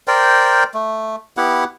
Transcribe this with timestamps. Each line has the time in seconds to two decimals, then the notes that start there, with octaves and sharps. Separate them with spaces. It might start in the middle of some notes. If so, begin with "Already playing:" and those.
0.08 A#4 C5 D5 G5
0.74 A3
1.37 B3 E4 G4 F#5